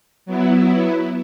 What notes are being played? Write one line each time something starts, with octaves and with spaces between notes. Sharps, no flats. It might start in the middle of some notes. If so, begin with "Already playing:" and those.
F#3 B3 E4